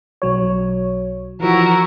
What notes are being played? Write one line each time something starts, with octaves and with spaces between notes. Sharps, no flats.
B1 F#3 C#5
E3 F3 E4 F#4 A#4